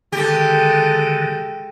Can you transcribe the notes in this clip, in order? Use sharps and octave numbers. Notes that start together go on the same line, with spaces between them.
D3 D#3 G#3 G4 A4